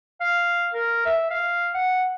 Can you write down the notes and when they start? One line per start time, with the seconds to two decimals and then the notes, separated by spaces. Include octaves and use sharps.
0.20 F5
0.73 A#4
1.05 E5
1.31 F5
1.74 F#5